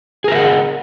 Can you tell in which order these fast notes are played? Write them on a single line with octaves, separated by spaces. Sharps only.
G#4 A#4 E5 F#5 D#5